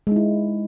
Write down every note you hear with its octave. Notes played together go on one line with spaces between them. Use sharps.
G#3 D#4 E4